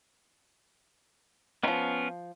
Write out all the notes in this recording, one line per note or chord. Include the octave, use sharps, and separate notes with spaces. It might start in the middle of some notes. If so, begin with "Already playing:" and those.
D#3 F3 B3 C#4 F4